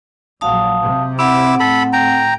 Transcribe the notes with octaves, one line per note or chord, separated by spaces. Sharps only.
A#1 F#3 F5 A5 D#6
C3
C4 E4 F#5 D6 E6
A2 A4 B5
G5 A#5